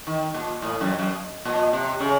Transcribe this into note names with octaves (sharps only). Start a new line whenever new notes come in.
D#3
A#2
A2
F#2
F#2
A#2
C3
C#3